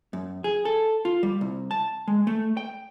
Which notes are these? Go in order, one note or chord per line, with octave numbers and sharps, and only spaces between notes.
F#2
G#4
A4
F4
G3
C2
A5
G#3
A3
G5